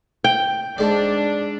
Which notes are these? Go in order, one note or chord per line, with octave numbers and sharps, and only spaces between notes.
G5
G#2 D4 D5